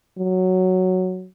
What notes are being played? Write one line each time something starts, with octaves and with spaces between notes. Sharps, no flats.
F#3